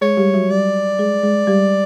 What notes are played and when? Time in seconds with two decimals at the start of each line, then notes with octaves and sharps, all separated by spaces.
0.01 G#3 G#4 C#5
0.17 G3 G4
0.34 F#3 F#4
0.50 G3 G4 D5
0.99 G#3 G#4
1.23 G#3 G#4
1.47 G3 G4